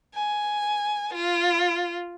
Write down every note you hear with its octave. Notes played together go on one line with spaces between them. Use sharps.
G#5
F4